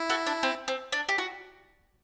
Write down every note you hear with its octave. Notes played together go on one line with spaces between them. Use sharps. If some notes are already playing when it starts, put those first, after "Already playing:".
Already playing: E4
F#4 A4
D4
C4
C4
D4
G4
F#4